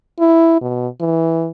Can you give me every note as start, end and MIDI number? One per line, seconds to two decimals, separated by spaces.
0.19 0.60 64
0.62 0.88 47
1.01 1.50 52